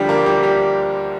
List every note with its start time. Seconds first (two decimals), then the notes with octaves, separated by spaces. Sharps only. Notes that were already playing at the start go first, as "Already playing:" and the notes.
Already playing: D2 D3 F3 G3 D4 G4
0.09 A#3 A#4
0.26 G3 G4
0.43 G3 G4